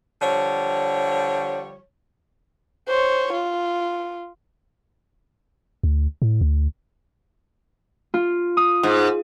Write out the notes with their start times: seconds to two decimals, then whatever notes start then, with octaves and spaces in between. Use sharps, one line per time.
0.22 D3 F3 G3 C#5
2.88 C5 C#5
3.33 F4
5.84 D2
6.22 A2
6.41 D2
8.14 F4
8.57 D#6
8.83 G#2